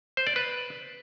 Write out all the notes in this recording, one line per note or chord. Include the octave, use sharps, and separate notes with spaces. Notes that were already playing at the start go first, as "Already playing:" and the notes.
C5
D5
B4